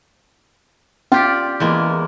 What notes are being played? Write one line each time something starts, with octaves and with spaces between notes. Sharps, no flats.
C#4 F4 G4 D5
E2 G#3 A#3